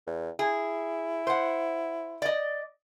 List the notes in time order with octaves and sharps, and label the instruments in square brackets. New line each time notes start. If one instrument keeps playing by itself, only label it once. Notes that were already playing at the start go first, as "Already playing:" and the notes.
[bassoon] E2
[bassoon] E4 [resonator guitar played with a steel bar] G#4
[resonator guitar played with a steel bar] C5 F#5
D5 D#5